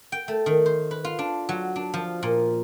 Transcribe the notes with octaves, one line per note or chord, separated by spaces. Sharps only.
G5
A3
D#3
C5
B4
F4
D4
F#3
D4
F3
A#2